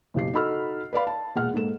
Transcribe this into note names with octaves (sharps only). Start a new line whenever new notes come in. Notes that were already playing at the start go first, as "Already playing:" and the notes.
F#1 B1 G4 C7
D#4 F#4 A4 B5 E6 F6
B4 D5 F5 B5
A5
E1 A#2 G#4 F#5 F6
G#2 A#3 A4 E7